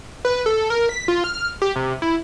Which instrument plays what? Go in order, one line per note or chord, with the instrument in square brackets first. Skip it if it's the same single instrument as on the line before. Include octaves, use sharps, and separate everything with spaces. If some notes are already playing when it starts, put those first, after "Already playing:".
[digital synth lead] B4
A4
A#4
B6
F4
F6
G4
C3
E4